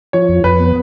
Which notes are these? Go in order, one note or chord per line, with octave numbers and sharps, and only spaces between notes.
F3 C#5
F2
F2 B4
B3